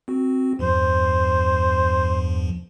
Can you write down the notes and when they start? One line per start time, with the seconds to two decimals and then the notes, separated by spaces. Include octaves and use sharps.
0.08 C4 F#4
0.59 E2 G2 F3 C5